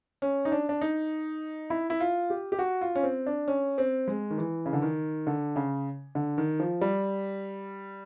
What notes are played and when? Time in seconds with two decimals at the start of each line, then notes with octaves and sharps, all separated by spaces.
0.22 C#4
0.45 D#4
0.52 D4
0.69 D4
0.82 D#4
1.70 E4
1.90 E4
2.00 F4
2.30 G4
2.52 G4
2.59 F#4
2.81 F4
2.95 C#4
3.03 C4
3.27 D4
3.48 C#4
3.78 C4
4.08 G#3
4.31 D#3
4.38 E3
4.66 C#3
4.73 D3
4.82 D#3
5.27 D3
5.56 C#3
6.15 D3
6.38 D#3
6.60 F3
6.81 G3